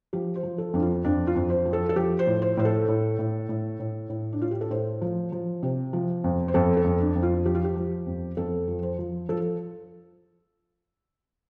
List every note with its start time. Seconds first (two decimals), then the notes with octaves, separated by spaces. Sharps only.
0.13 F3 G4
0.36 C5
0.43 F3
0.58 A4
0.73 F2 D4
0.82 F4
1.05 F2 D4
1.27 F4
1.35 F2
1.50 C5
1.66 F3
1.73 A4
1.89 A4
1.96 F3 G4
2.19 C5
2.27 A2
2.42 C5
2.57 A2 C5
2.65 A4
2.88 A2
3.19 A2
3.49 A2
3.79 A2
4.09 A2
4.33 D4
4.40 A2 F4
4.51 G4
4.61 A4
4.71 A2 C5
5.01 F3
5.32 F3
5.63 C3
5.93 F3
6.24 F2
6.48 C5
6.54 F2 A4
6.77 A4
6.84 F2
7.00 D4
7.15 F2
7.23 F4
7.46 F3 G4
7.55 F4
7.64 G4
7.76 F3
8.06 F2
8.37 F2 A4
8.68 F3
8.83 C5
8.99 F3
9.29 F3 A4